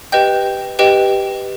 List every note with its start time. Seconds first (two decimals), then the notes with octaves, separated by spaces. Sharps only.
0.12 G4 B4 D#5 G5 G6
0.79 G4 B4 D#5 G5